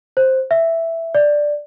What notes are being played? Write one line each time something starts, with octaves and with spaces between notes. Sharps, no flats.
C5
E5
D5